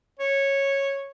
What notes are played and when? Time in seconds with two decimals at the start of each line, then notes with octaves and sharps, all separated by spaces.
0.19 C#5